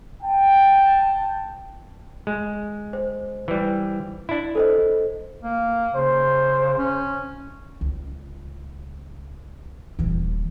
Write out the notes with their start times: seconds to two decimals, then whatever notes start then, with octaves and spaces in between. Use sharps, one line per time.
0.22 G5 A5
2.27 G#3
2.93 C5
3.48 E3 G3
4.29 D4 E4
4.55 A4 C5 D#5
5.43 A#3
5.95 C#3 C5
6.78 C#4
7.81 C#2
9.99 D#1 E3